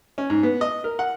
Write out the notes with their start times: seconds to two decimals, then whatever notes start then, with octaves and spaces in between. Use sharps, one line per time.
0.18 C#4
0.30 G#2
0.43 B3
0.61 D#5
0.84 A#4
0.99 F#5